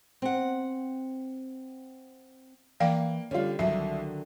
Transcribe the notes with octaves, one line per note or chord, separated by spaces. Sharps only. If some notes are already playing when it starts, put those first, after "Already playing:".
C4 F#5
E3 A#3 D5 F5 G5
D3 G3 C#4 F4
C2 D3 D#3 F#3 E5